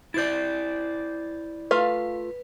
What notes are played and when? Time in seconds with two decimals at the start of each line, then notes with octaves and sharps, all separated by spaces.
0.14 E4 C5 D5 G6 A6
1.71 A3 F4 B4 F5